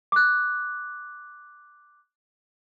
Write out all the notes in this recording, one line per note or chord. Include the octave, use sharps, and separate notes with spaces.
D6 F#6